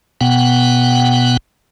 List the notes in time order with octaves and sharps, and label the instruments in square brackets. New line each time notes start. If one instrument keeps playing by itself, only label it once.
[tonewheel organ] B2 B3 F#5 G5